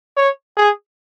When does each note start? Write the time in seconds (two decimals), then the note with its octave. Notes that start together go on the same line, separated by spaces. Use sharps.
0.17 C#5
0.57 G#4